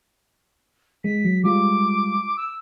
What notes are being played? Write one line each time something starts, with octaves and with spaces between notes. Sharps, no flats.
G#3 B6
F#3
G3 G#3 F4 D6
E6